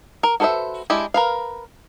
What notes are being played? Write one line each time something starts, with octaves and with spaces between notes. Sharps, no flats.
A#4
F#4 A4 B4 C5 E5
G#3 D4 E4 G4
A#4 B4 F5